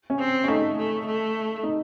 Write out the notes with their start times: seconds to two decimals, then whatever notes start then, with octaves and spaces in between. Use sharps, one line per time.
0.10 C#4
0.20 C4
0.44 C#4
0.49 A3 D#4
0.78 A3
1.06 A3
1.63 D#4